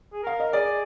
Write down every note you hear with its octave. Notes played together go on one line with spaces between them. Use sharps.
G#4
A#4 F5
D#5
G#4 D5